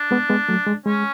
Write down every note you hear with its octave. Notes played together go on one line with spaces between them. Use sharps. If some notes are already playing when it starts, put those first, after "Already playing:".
Already playing: D4
G#3 B3
G#3 B3
F#3 A3
G#3
G#3 C#4